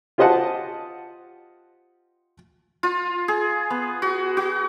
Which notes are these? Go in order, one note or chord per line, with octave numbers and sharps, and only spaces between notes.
F4 G4 C5 D#5 F#5 A5
F4
G#4
B3
F#4
F#4